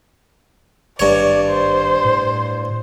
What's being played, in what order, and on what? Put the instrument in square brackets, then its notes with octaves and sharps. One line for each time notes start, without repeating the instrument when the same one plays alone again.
[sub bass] G#1 [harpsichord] G2 C#5 [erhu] D5
[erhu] C5
[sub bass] A2